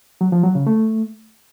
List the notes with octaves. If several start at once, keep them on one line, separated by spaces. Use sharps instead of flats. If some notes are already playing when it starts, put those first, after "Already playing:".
F#3
F3
F#3
C#3
A3